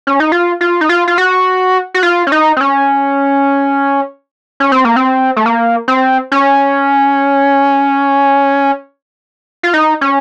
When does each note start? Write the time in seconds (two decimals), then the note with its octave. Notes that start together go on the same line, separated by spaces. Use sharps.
0.07 C#4
0.20 D#4
0.32 F4
0.61 F4
0.81 D#4
0.89 F4
1.08 F4
1.18 F#4
1.94 F#4
2.03 F4
2.27 C#4
2.32 D#4
2.57 C4
2.61 C#4
4.60 C#4
4.72 C4
4.85 A#3
4.96 C4
5.36 A3
5.46 A#3
5.88 C4
6.32 C#4
9.63 F4
9.74 D#4
10.01 C#4